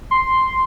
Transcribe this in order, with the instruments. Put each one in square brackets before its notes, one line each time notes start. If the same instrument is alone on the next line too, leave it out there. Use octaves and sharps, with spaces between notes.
[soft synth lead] C6